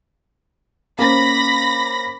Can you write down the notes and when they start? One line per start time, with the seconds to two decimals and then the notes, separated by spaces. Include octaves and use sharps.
0.99 A#3 C#4 C5 B5 A#6